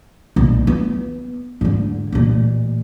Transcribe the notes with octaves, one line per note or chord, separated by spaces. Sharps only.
B1 A#2
B3
G#2 D3
A1 A#2